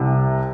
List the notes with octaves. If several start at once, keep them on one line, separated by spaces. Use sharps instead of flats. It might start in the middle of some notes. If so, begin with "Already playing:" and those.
Already playing: C2 C3